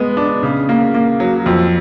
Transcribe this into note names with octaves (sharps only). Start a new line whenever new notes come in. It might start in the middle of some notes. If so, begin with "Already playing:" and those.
Already playing: G#3 B3
D4
C#3
A#3
A#3
F#3
F2